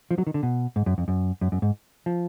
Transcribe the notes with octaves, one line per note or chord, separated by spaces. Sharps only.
F3
F#3
D#3
D3
B2
G#2
F#2
F2
F#2
F#2
F#2
G#2
F3